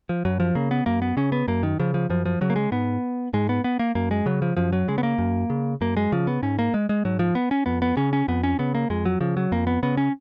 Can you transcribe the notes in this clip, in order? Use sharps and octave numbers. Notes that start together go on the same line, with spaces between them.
F3
F#2 F#3
F3
C#3 A#3
B3
F#2 A#3
B3
C#3 C#4
B3
F#2 A#3
D#3
C#3 F3
F3
F#2 F3
F3
C#3 F#3
A#3
G#3
G#2 B3
G#2 G#3
B3
B3
A#3
F#2 A#3
G#3
C#3 F#3
F3
F#2 F3
F#3
C#3 G#3
B3
A#3
F#2
C#3
F#2 A#3
G#3
C#3 F3
B3
G#2 C#4
A#3
G#3
G#3
G#2 F#3
F3
B3
C#4
F2 B3
B3
C#3 C#4
C#4
F2 B3
C#4
C#3 B3
A#3
F2 G#3
F#3
C#3 F3
F#3
F2 A#3
B3
C#3 B3
C#4